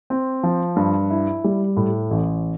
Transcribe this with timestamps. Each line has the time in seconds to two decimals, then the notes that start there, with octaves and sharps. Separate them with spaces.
0.10 C4
0.43 F3
0.76 G2
1.10 E4
1.44 G3
1.77 A2
2.11 A1